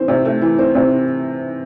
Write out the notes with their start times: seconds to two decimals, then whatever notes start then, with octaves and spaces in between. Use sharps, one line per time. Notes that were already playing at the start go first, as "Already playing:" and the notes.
Already playing: E3 C4
0.08 C3
0.25 A3
0.42 E3
0.59 C4
0.75 C3